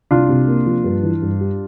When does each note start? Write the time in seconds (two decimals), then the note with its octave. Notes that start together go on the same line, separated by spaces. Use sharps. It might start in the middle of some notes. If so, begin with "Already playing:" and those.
0.11 C2 D4 F4
0.29 C3
0.48 A#3
0.66 F3
0.84 G2
1.03 E3
1.22 G2
1.41 G3